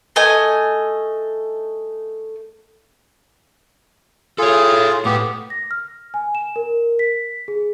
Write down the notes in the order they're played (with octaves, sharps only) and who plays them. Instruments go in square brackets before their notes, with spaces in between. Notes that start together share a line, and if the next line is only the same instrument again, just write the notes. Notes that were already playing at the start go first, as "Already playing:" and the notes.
[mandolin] A3 D#5 G#5
[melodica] F4 G#4 [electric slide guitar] A4 C#5
[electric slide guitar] A2 [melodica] B3 G4
[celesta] A#6
F6
G#5
E7
A#4
B6
G#4